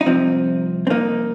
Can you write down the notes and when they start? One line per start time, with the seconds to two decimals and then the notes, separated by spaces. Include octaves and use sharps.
0.01 D#4
0.06 C2 C3 F3 C4
0.87 C4
0.90 A#3 D#4